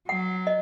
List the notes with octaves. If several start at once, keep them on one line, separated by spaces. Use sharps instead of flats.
F#3 F#5
D#5